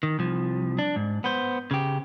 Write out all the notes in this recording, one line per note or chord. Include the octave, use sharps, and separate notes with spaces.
D#3
C2 F3
D4
G#2
B3 C5
C#3 G4